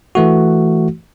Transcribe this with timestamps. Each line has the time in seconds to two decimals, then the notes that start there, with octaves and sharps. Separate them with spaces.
0.15 E3 A3 F#4